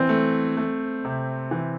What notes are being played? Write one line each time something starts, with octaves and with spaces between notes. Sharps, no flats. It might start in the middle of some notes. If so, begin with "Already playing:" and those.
Already playing: E3 C4
A3
A3
C3
E3